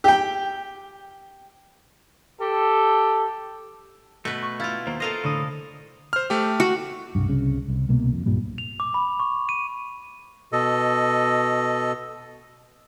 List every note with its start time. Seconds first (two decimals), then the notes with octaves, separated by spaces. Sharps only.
0.04 G4 G5
2.40 G4 A4
4.25 B2 A3 B4
4.42 C#6
4.60 E4 F4 F5 A6
4.87 D#2 A#3 C5
5.00 F4 A4 A#4 D#5 F5
5.24 A2 D3 D#6
6.13 C5 F6
6.30 A3 G4
6.60 F#4
7.15 C2 G2
7.28 C2 C#3
7.68 C2
7.89 C2 B2 A#3
8.13 F2
8.26 B1 G2 A#2 G3
8.58 F7
8.80 D6
8.94 B5
9.20 C#6
9.49 D#7
10.52 B2 A4 D#5